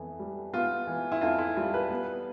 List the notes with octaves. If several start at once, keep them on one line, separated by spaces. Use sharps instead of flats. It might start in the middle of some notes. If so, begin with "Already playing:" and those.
Already playing: F2 E3 B3
G3
B3 F4
E3
E4
F2 F4
E4
G3 F4
B4
B3